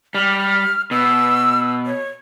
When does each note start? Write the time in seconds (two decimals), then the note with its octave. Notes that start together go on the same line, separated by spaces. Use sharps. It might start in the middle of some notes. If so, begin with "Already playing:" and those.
0.15 G3 F6
0.91 B2 E6
1.86 C#5